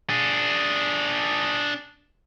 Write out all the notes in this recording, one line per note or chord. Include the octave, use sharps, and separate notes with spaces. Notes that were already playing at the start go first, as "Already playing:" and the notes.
D4 G#4